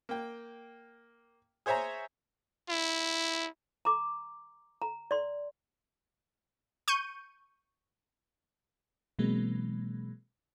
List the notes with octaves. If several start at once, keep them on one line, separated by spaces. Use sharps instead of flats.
A#3 G5
G#4 C5 C#5 E5 G#5 A#5
E4
A#5 D6
A#5
D5 C6
C#6 G6 D#7
B2 E3 F#3 G#3 A#3 C4